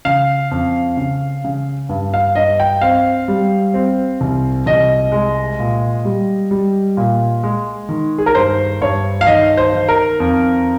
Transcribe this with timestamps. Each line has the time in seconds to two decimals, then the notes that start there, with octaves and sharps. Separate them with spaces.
0.05 C#3 F5
0.51 F2
0.97 C#3
1.44 C#3
1.89 G2
2.14 F5
2.35 G2 D#5
2.60 G5
2.81 C4 F5
3.28 G3
3.74 C4
4.21 C2
4.66 C2 D#5
5.12 G#3
5.59 A#2
6.05 G3
6.51 G3
6.97 A#2
7.43 G#3
7.89 D#3
8.18 G#4
8.26 A#4
8.35 G2 C5
8.81 G2 C#5
9.21 F5
9.27 D#3 D#5
9.57 C5
9.73 D#3
9.88 A#4
10.20 F2